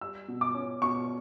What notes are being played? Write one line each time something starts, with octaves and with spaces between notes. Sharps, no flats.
G3 E6
B2
D6
C#4
B2 C#6